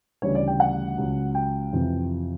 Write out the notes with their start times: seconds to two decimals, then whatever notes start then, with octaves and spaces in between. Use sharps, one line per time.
0.22 D2 C#3 E3 G3 C#5
0.35 D5
0.48 G5
0.60 F#5
0.98 C#2 C#3 F#3
1.35 G5
1.73 F2 C3 E3